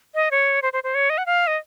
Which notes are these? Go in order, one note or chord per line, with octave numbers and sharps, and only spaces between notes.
D#5
C#5
C5
C5
C5
C#5
D#5
F#5
F5
D#5